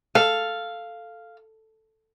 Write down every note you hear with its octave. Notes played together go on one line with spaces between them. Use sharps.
A4 F5